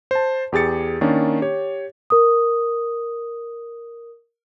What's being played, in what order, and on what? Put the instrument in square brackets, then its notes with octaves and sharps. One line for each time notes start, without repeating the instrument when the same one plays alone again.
[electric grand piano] C5 A5
E2 G4 G#4 A6 C#7
D#3 A#3 C#4 D4
G4 C#5
[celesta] A#4 D#6